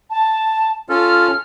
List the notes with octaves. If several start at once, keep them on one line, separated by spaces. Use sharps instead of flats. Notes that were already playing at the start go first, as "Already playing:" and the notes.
A5
C#4 F4 A4 F6